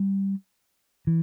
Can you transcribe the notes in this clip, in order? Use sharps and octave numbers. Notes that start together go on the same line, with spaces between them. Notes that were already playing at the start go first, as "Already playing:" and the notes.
Already playing: G3
E3